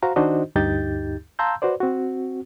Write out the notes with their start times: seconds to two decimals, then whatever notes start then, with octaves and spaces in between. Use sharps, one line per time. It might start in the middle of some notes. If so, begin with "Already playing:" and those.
0.03 F#4 C5 F5 A#5
0.16 D#3 D4 D#4 F#4 C5 D#5
0.56 D2 G2 D#4 G4 G6 A6
1.39 F5 A5 A#5 C6 E6 G6
1.62 F#4 B4 C5 D5
1.80 C4 F#4